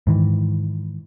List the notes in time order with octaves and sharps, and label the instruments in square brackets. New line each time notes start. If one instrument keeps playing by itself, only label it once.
[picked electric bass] G#2 D#3 E3